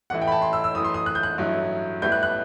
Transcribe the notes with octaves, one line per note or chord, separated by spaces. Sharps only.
A1 A2 E3 A3 E4 F#5
G5
B5
A5
C6
E6
E6
F#2 E3 A3 E4 D#6
C6
D#6
F#6
G6
F#6
A1 G2 F#3 A3 E4
A2 G3 B3 E4 G6
F#6
F#6